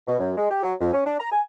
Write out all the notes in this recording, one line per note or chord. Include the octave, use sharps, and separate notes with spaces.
B2
F#2
G#3
G4
F#3
F2
C#4
D4
A#5
G#5